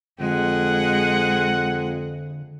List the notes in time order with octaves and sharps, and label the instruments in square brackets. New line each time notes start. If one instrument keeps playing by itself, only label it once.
[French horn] F2 [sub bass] D3 [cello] G#3 G#4 [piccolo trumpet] F#5